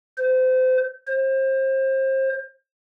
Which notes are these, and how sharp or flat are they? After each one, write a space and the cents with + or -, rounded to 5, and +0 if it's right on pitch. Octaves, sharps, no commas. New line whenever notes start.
C5 -30
C5 +30